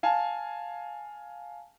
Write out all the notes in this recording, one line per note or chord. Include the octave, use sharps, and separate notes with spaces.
F5 G#5 A5